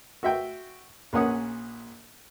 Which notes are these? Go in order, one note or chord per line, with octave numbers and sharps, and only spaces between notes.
F#4 E5 G5
A#1 A#2 C#4 F#5 D#6